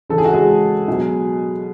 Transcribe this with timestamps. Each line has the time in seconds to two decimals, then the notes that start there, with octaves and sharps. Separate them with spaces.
0.10 C#3 E3 A4
0.18 G#4
0.25 F#4
0.33 G#3 G#4
0.88 B2 F#3